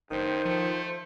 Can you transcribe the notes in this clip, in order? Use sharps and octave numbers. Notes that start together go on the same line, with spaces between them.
F#1 G2 D#3 C5
F3 A3